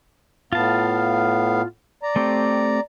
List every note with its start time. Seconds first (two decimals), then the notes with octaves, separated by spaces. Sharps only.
0.53 A2 B3 F4 F5 A5
2.03 D5 A#5
2.16 A3 C4 G4